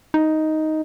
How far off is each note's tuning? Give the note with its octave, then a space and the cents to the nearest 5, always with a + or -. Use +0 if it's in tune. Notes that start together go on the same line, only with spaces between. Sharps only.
D#4 +5